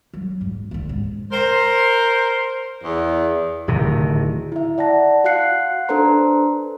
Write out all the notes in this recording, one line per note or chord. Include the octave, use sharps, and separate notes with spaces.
F#3
G#2
D2 D3
G#2
A#4 C5
E2
D1 C3 D#3
E4 E5
D5 F#5 A5 A#6
F#4 F5 F#5 F#6 C7 C#7
D4 A4 B4 C5 A#5 C6